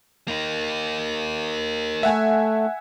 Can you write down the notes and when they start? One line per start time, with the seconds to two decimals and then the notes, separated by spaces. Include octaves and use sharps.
0.28 A#3 D#4
2.03 A3 E5 F#5 G#5